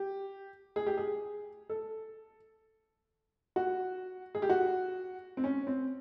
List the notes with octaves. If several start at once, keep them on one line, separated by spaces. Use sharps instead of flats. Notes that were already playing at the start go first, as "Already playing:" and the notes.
Already playing: G4
G#4
G4
G#4
A4
F#4
G#4
G4
F#4
C4
C#4
C4